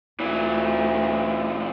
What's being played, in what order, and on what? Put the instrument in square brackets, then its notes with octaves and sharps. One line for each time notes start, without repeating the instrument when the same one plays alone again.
[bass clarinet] D2 [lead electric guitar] A#2 E3